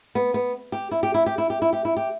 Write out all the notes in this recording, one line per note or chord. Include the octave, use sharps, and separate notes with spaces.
B3
B3
G4
E4
G4
E4
G4
E4
G4
E4
G4
E4
G4